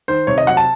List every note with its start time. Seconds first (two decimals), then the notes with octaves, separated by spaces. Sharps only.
0.08 D#3 C5
0.27 C3 C#5
0.38 D#5
0.47 F#3 F#5
0.57 A5